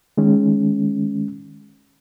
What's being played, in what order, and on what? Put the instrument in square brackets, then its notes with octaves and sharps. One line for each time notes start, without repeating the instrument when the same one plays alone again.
[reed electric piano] D#3 G#3 C#4